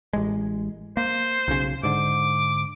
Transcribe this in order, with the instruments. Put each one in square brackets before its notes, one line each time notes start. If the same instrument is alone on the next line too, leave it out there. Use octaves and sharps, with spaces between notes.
[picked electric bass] A1 G#3
[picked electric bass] A#3 [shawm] C5
[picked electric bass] B1 C#3
[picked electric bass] G#2 D3 [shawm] D6